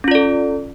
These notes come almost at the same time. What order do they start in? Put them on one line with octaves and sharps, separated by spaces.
C#4 F4 D5 A4